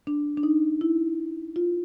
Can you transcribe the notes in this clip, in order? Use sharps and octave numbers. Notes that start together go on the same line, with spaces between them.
D4
D4
D#4
E4
F4